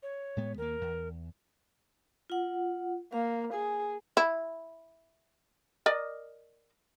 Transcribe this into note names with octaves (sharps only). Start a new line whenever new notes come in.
C#5
A2 G#3 B3
D#2 A#3 A#4
E2
F4 F#5
A#3 F5
G#4 G#5
E4
A#4 D5 D#5